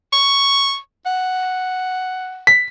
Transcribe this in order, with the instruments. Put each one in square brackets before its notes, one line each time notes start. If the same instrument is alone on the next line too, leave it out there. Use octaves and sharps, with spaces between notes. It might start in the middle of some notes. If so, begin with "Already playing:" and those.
[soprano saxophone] C#6
F#5
[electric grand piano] B6